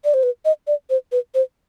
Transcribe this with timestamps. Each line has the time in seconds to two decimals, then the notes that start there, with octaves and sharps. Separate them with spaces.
0.04 D5
0.14 C5
0.23 B4
0.45 D#5
0.67 D5
0.90 C5
1.12 B4
1.34 C5